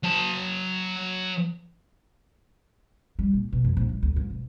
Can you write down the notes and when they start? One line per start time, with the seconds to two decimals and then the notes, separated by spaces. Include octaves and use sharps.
0.03 F#3 A5
3.19 G3
3.34 A#2
3.53 B2
3.64 F2
3.77 A#1
3.89 G#2
4.03 D2
4.16 G#2
4.31 E1